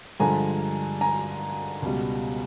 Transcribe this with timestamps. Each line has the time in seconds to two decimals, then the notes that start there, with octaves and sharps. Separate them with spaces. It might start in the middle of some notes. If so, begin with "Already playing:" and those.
0.20 G2 D3 F3 G#3 G#5 A#5
1.01 G#5 A#5
1.82 C#2 B2 G3